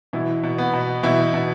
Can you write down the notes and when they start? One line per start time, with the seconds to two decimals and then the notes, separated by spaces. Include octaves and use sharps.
0.13 B2 E3 E4
0.43 B2
0.58 B3
0.73 B2
1.03 B2 E3 E4
1.34 B2